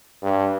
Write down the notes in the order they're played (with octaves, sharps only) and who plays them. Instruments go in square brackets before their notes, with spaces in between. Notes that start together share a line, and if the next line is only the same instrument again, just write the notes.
[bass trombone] G2